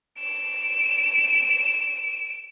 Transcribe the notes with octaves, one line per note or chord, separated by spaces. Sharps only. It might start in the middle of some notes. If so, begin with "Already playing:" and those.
D7 E7